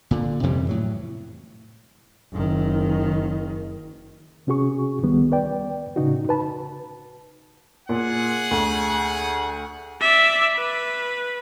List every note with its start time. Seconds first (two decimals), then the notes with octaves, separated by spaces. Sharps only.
0.11 A#2 D3
0.43 F2 C3 E3 G3
0.69 A2 F#3
2.33 F#1 D#3
4.47 C3 C#4 F#4 G#4 C#6
5.03 C#2 D#3 G3 B3
5.32 B4 D5 G5
5.96 A2 C#3 D#4 F#4
6.29 B4 A5 B5
7.89 A#2 G#4 F#5
8.51 D2
10.01 D5 E5
10.56 B4